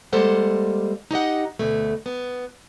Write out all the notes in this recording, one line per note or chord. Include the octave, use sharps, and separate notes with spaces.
G3 G#3 A#3 A4 C5 F#5
D#4 G4 D#5 F#5
D2 B2 A3
B3